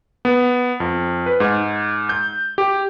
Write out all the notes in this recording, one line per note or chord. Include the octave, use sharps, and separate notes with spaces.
B3
F2
B4
G#2
G6
G4